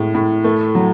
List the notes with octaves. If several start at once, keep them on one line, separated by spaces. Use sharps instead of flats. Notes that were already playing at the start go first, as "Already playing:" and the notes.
Already playing: A2 G#3
A2
A3
F#3